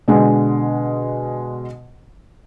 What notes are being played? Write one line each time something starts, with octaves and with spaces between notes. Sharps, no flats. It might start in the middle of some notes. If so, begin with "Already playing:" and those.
B2 D3 G#3